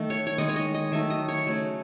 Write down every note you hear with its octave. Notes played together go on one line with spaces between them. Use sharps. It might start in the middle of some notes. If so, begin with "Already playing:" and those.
Already playing: D#3 A3
C#5
C#5
D#3 G#3 D#5
C#5
D#5
D#5
D#3 F#3 A3 E5
D#5
C#5
C#3 F#3 A3